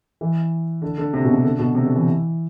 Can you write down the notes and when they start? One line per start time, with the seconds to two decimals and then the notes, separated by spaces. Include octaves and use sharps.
0.21 E3
0.82 D3
0.98 D3
1.14 C3
1.24 B2
1.34 C3
1.44 D3
1.59 B2
1.75 C3
1.84 D3
1.95 E3